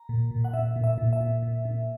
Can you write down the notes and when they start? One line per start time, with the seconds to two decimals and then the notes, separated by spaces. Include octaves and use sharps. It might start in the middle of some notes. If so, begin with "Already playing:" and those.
Already playing: A#5
0.09 A#2
0.31 A#2
0.44 F#5
0.53 A#2 E5
0.76 A#2
0.84 E5
0.98 A#2
1.13 E5
1.21 A#2
1.43 A#2
1.65 A#2